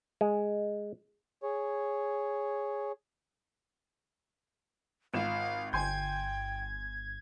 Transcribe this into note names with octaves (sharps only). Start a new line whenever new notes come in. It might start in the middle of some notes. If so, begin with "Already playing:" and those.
G#3
G#4 C#5
G#1 F4 F5 E7
G1 G5 G#5 C6 G6 G#6